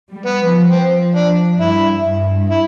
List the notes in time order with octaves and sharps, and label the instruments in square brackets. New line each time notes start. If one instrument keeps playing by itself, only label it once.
[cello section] G3
[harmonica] B3
[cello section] F3
[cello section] F3 [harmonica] C4
[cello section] F3 [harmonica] D4
[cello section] G2 [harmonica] E4
[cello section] G2
[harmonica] E4